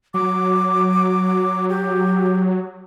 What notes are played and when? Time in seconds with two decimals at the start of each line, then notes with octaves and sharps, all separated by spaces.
0.14 F#3 D6
1.69 G4